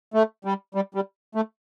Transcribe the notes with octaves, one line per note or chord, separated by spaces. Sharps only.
A3
G3
G3
G3
A3